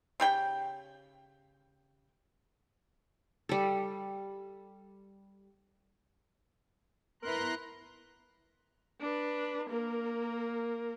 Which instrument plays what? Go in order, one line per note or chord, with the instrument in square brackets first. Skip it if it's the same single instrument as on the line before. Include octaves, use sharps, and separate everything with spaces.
[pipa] C#3 G4 G5
[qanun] G3 A4
[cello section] B3 E4 B4 [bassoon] A#4 [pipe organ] A#5 C6 F#6
[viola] D4 B4
A#3 A#4